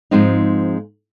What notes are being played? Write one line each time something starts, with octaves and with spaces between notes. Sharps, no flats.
G#2 F3 G#3 C4 D#4